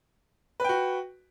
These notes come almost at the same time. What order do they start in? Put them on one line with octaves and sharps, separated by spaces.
B4 G5 F#4